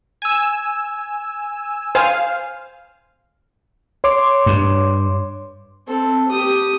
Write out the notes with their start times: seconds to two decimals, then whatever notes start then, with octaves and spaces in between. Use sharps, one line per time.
0.22 G#5 E6
1.95 C5 F5 G#5
4.04 C#5 C6 D6
4.46 G2
5.87 C4 A4
6.29 G4 D#6